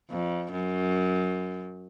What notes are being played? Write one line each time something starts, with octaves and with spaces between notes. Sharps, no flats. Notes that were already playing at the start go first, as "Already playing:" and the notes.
F2
F#2